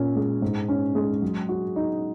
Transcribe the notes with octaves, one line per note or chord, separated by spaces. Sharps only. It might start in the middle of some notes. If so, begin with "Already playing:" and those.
Already playing: A#2 C#4
G#3
G#2
C#4
G#3
F#3
F#4
D#4